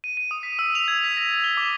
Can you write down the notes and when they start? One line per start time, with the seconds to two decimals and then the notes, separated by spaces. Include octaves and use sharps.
0.04 D#7
0.17 D#7
0.31 D#6
0.43 B6
0.59 E6
0.75 F7
0.88 G#6
1.04 B6
1.17 A#6
1.31 A6
1.44 G7
1.57 D6